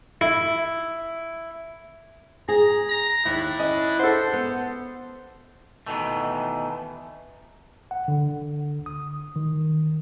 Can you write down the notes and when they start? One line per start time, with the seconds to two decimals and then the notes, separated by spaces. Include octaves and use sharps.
0.21 E4
2.48 G#4 A#5
2.89 A#5
3.26 D#2 D4 E4
3.59 C#4 D#5
3.99 A4 C5 F#5
4.33 B3
5.86 B2 D#3 E3 A3
7.91 F#5
8.08 D3
8.86 D#6
9.36 D#3